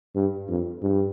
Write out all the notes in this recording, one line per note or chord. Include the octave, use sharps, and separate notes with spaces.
G2
F2
G2